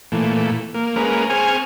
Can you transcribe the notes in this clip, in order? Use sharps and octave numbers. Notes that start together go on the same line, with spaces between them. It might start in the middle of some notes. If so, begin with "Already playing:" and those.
A#2 E3 A3
A#3
G#3 A#3 C#4 A#4 B4
C4 G#4 G#5 C#6 F6